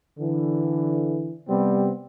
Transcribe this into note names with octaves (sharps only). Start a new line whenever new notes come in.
D3 E3
C3 G3 B3 C4